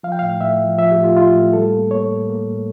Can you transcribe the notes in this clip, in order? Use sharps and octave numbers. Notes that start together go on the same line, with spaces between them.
F3 F5
G5
F5
A2
A2 E5
F3
F3 E5
G4
A2
F4
A2 F4
A2
G3 A4
A#3
A#3 C#5
A2
A#3
A2